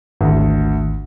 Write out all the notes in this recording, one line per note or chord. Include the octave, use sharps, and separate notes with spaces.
G#1 D2